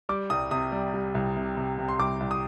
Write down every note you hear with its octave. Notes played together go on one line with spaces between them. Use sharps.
G3 D6
C2 D#6
C3 D#6
G3
G3
C2
C3
C3
C3
C6
C2 D6
C2
D#6